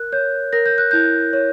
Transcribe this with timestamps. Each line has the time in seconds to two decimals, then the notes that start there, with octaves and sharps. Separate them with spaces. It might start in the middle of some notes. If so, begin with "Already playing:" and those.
Already playing: A#4 F#6
0.13 C#5 G6
0.53 A#4 A#6
0.66 G6
0.78 F#6
0.91 E4 G6
1.33 C#5